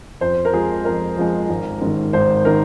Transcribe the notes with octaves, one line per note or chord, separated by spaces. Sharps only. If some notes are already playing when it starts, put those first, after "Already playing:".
F2 C5
A#4
F3 G#3 G#4
F2 A#4
F3 G#3
G#1
G#2 D#3
G#1 C5
D#3 A#4